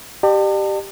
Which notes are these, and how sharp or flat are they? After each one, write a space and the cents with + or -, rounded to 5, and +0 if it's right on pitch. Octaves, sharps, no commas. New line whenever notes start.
G4 -5 D5 +45 A5 +40